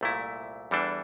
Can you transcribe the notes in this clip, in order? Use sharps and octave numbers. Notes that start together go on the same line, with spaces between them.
C2 A#2 A3 E4
E2 E3 G3 D4 A4